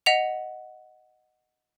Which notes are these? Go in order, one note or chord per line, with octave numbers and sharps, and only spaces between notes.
D#5 F#5 B6 F7